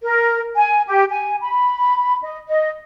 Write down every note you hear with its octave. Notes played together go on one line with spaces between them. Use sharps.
A#4
G#5
G4
G#5
B5
D#5
D#5